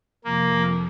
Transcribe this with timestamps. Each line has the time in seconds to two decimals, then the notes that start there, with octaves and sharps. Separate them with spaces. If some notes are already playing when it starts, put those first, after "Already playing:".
0.24 F2 C3 F3 A#3